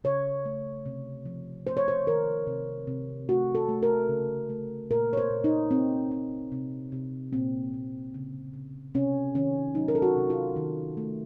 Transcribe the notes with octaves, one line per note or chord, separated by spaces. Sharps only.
C#3 C#5
A3
C3
F3
A3 C5
C#5
C5
D#3 A#4
C3
C3
A3 F#4
A4
A3
A#4
C#3
A3
A#2 A#4
C#5
C5
A#2
D#4
C4
C4
C3
C3
A#2 C4
A#2
C#3
C#3
C3 C#4
D#3 C#4
F#3 D#4
A#4
A4
F#4
C3
F4
D#3
A3